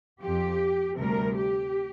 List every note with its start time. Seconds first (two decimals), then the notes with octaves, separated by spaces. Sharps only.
0.22 F2 F3 G4
0.97 D2 C3 G3 A#4
1.37 G4